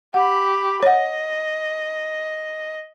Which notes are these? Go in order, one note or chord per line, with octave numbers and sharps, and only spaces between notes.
G4 F#5 B5
C#5 D#5 F#5